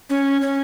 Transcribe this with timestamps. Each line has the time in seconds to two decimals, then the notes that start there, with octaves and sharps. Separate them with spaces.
0.10 C#4
0.42 C#4